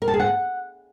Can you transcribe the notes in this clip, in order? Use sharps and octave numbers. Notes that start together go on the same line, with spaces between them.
A#4
A5
G#4
F#5